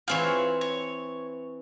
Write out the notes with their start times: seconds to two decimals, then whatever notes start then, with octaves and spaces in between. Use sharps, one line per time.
0.08 E3 C4 F4 G#4 C#5 G5
0.61 C#5